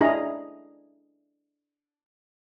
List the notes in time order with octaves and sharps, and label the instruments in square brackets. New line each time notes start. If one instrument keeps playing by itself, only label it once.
[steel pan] D4 E4 G#4 D#5 A#5